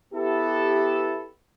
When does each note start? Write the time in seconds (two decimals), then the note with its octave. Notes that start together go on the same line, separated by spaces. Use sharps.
0.13 B3 E4 G4 A4